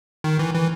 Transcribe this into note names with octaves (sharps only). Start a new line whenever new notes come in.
D#3
E3
E3